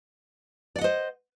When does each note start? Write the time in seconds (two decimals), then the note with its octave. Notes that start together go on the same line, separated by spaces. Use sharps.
0.76 D5
0.78 F#5
0.81 D#5
0.84 C5